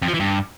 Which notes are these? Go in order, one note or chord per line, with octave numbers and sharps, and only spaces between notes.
F2
F3
E3
G2